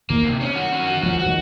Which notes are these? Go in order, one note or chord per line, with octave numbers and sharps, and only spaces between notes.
D#3 A#3
C3
C#4
F#4
C#4
F#4
F3 F#4
F#4
D#3